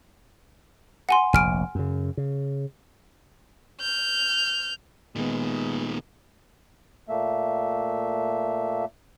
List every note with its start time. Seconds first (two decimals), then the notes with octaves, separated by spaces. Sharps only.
1.09 F#5 G#5 C6
1.33 F1 A#1 G#5 F6 D7
1.75 F#2 C#3
2.17 C#3
3.80 F6 G6
5.16 A#2 D#3 G#3 B3
7.09 A#2 A3 A#3 E5